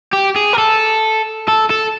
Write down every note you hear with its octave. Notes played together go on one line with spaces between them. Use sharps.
G4
G#4
A#4
A4
A4
A4